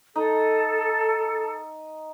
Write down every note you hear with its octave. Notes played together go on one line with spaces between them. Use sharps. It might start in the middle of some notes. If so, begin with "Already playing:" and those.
D#4 A4